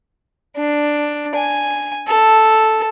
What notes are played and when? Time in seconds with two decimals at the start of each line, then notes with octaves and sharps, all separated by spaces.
0.57 D4
1.35 G#5
2.08 A4